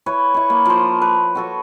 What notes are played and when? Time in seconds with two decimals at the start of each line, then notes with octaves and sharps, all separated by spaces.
0.06 E4 B4 C#5
0.34 E4 C#6
0.50 A#3
0.65 F3 C5
1.02 B4
1.35 F#4 A4 C#5